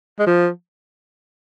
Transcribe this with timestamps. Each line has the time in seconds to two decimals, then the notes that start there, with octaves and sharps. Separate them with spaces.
0.19 G#3
0.27 F3